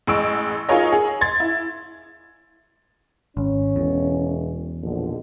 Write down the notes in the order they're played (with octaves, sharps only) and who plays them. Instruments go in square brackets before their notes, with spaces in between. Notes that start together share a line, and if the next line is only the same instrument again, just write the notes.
[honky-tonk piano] A1 G#3 C#6 E6 D7
D#4 F4 G#4 A#4 C#5 D#5
G#4
C6 G#6 A6
E4
[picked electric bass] G#1 [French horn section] C#4
[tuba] E1 [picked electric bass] E2
[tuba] A#1 [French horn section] G#2 B2 D3